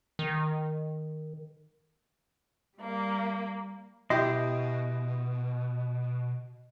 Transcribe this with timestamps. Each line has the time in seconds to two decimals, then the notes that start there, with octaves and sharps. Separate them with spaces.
0.19 D#3
2.78 G3 A#3
4.10 B2 E4 G4 D#5 C6